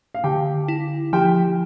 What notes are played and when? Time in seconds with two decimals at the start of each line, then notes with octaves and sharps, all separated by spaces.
0.14 F5
0.24 D3 G4 G5
0.68 E4
1.13 F3 G4 G5